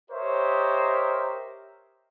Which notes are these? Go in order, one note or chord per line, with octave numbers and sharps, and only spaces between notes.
G4 A#4 C5 C#5 D#5 E5